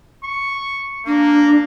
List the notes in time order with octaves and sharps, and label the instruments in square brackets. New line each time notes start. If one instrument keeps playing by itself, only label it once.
[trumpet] C#6
[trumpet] A#3 [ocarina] D4